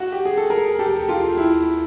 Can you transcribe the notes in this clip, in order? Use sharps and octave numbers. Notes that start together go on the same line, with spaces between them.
F#4
G4
G#4
A4
G#4 A#4
G4 A4
F4 G4
E4